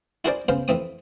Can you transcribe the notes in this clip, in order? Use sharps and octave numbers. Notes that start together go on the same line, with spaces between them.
E4 F#4 G#4 A#4 C5 D5
C#3 B3 C5 F5
F2 E3 C4 D#6